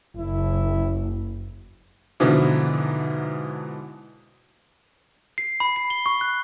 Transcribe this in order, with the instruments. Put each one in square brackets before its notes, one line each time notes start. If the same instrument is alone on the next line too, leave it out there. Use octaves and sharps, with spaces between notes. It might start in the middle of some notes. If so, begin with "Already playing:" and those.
[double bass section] F#1 [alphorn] E4
[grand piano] G#2 B2 D3 E3 F3
[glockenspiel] C7
B5
C7
G7
C#6
F#6